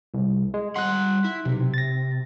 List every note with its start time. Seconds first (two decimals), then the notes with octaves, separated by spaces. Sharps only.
0.14 C2
0.54 G#3
0.76 G3 F#5 C6 F#6
1.24 E4
1.45 B1 C3
1.74 A6 A#6